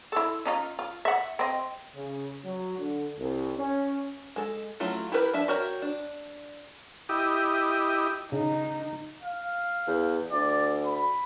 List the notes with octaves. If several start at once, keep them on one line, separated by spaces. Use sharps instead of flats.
E4 A4
C#4 D#4 F4
F4
E5 F#5
C4 D#5
C#3
F#3
D3
C2
C#4
G#3 A4
F#3 A3 C#4 E4 F4
E4 G4 A#4 B4
F3 D4 E5 A5
F#4 G4 A#4 C#5 E5
D4
E4 G4 D#5
C#3 D#4
F5
E2
D2 D5
B5